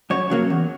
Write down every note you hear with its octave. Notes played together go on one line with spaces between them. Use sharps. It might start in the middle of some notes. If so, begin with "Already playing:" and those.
F#2 C#5
C#3 F#3 A#3
E2